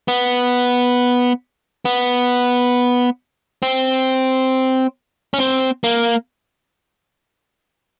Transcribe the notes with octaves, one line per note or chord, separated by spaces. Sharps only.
B3
B3
C4
C#4
C4
A#3